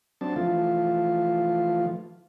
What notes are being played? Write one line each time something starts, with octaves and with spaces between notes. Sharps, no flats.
F#3 C4 D4 A5
E3 F3 A3 F4